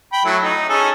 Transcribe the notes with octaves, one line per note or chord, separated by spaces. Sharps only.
G5 B5
F#3 A3 E4
D#4
C#4 G#4 A4